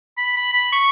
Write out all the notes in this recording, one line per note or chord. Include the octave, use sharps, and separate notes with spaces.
B5
B5
B5
C#6